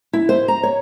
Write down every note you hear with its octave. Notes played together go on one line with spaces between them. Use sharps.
E4
C5
A#5
C#5